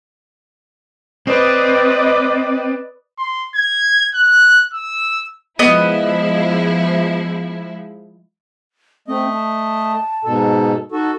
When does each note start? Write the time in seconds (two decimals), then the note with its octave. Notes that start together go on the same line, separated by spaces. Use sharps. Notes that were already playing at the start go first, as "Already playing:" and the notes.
1.27 C4 B4 D5 D#5
3.19 C6
3.55 G#6
4.14 F#6
4.74 E6
5.59 F3 G#3 B3 E4 D#5
9.08 A3 C4 D#5
9.33 A5
10.25 G#2 B2 A4
10.92 D#4 F#4 A4